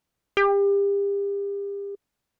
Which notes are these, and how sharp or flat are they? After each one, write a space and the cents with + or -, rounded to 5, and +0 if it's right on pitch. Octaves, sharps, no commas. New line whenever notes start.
G4 +35